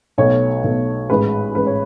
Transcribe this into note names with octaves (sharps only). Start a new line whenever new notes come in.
B1 B2 A3 C#5
B1 B2 A3
A1 G#2 G#3 B4
A1 G#2 G#3 B4
C#5